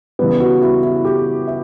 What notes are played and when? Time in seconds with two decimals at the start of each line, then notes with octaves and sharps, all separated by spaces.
0.19 C#3 E3 G3 B3
0.40 F#4
0.61 E4
0.83 E4
1.05 G4
1.47 E5